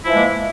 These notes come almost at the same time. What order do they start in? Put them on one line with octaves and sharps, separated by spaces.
E4 F3 E3 G#3 A#3